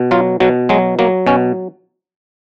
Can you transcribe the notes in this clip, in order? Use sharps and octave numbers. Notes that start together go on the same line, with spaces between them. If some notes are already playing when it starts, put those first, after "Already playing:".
Already playing: B2
F#3 F4
B2 F#3
F#3 G#3
F#3 A#3
B2 C#4